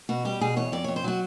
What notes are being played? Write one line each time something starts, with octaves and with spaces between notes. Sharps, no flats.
B2 F#4
G3 G4
B2 G#4
E2 C#5
F2 D5
F2 C#5
C5
F#3 F#4